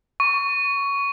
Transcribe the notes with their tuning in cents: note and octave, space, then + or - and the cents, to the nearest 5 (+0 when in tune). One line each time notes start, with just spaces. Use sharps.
C#6 +15